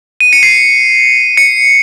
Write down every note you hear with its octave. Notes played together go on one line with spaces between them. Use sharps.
D#7
C#7
C7
C#7